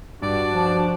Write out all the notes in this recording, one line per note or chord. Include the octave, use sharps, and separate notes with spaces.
G2 D4 F#4 D5 A5
F3